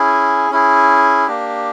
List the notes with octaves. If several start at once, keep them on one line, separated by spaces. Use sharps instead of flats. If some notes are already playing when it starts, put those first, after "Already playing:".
Already playing: C#4 E4 G#4
C#4 E4 G#4
A#3 D4 G4